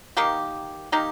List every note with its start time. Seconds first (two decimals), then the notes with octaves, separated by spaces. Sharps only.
0.17 D#3 A#3 D#4 G4
0.92 D#3 A#3 D#4 G4